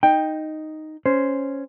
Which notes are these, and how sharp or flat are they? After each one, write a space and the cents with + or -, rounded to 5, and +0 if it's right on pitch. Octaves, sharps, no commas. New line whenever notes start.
D#4 +0 G5 +5
C#4 +0 C5 -5